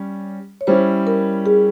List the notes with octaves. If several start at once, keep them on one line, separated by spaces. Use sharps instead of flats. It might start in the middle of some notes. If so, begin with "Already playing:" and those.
Already playing: G3 C#4
C#5
G3 C#4 E4 C5
A#4
G#4